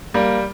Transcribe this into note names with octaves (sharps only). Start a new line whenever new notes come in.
G3 A#3